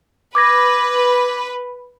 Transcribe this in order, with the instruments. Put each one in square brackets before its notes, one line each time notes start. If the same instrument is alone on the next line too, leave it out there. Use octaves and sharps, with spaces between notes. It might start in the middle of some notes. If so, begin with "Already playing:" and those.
[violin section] B4 [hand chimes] D6 G#6 A#6